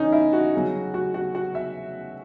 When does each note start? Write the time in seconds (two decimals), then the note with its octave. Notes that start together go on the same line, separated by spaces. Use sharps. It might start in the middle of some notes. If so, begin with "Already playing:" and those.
Already playing: C#3 E3 C#4 D#4
0.12 E4
0.33 F#4
0.54 C#3 F#3
0.94 F#4
1.14 F#4
1.35 F#4
1.55 E5